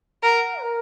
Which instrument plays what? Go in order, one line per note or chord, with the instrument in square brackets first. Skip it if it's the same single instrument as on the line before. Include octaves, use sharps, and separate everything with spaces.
[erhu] A#4 [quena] F#5
[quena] A#4